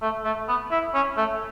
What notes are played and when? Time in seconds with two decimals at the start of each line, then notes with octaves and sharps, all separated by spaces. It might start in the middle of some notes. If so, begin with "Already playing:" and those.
0.02 A3
0.25 A3
0.48 B3
0.71 E4
0.94 C#4
1.17 A3